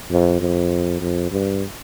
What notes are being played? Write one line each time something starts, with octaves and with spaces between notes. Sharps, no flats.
F2
F2
F2
G2